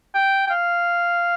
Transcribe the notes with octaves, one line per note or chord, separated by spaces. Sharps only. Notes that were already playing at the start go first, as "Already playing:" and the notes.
G5
G5
F5